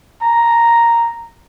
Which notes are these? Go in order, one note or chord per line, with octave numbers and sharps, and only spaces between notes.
A#5